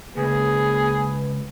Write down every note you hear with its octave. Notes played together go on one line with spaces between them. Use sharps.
C#2 A#3 G#4 B4